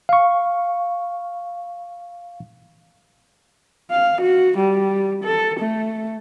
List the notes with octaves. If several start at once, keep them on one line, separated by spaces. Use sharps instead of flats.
F5 C#6
F5
F#4
G3
A4
A3